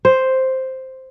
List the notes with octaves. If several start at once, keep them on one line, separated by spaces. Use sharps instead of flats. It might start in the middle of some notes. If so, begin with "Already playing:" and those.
C5